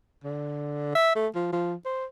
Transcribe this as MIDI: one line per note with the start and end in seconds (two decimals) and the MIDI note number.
0.24 0.94 50
0.95 1.13 76
1.15 1.28 57
1.35 1.48 53
1.52 1.74 53
1.85 2.05 72